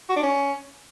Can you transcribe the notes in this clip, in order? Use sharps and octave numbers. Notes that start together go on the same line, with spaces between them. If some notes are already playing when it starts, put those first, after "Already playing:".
F#4
D4
C#4